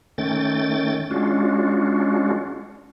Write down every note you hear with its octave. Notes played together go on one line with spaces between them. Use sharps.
D#3 A3 C#4 G5 A6
G#3 C#4 D4 F4 F#4